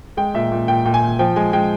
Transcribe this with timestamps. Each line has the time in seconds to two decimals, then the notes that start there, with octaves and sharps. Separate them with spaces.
0.17 G#3 G5
0.34 A#2 E5
0.52 A#2
0.68 A#2 G5
0.85 A#2 G5
0.94 G#5
1.03 A#2
1.19 F3 G5
1.36 G#3 G#5
1.53 G#3 G5